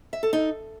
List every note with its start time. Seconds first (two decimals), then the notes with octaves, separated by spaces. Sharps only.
0.13 E5
0.23 A4
0.33 D#4